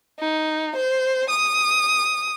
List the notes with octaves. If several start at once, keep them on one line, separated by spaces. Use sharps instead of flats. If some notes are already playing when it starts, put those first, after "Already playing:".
D#4
C5
D#6